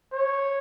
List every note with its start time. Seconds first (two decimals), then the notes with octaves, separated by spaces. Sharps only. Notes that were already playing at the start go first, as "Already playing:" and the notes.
0.13 C#5